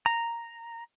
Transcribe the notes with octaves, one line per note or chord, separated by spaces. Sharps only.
A#5